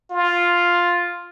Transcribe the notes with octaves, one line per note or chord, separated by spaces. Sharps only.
F4